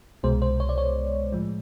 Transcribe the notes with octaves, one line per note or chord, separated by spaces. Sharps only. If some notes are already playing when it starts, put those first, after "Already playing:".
C2 B2 G#3 C5
C5
C#5
D5
C#5
A2 F3 G#3